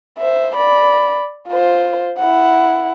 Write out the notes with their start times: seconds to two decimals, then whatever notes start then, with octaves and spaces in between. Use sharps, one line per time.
0.19 C5 E5
0.56 D5 B5
1.48 F4 C5
2.18 E4 F#5